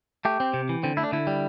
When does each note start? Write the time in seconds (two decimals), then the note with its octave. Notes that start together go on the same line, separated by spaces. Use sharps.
0.25 A3 G4
0.40 C4
0.54 C3
0.69 E3
0.83 D3 C4
0.97 A3 E4
1.03 D4
1.12 D3 E4
1.27 G3